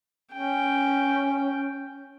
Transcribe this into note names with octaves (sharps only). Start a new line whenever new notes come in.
C#4 G5